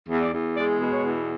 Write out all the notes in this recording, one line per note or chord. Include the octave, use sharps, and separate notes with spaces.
E2
D5
E2
G#3 D5
B2
C#5
E2